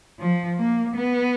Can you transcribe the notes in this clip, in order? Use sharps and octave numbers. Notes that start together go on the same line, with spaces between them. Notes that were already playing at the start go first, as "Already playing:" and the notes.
F3
A#3
B3